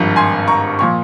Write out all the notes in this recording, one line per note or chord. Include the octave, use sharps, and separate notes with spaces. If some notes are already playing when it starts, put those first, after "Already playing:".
Already playing: G#1 G2 F3
G#5 C6
A#5 C#6
A#2 F3 C#6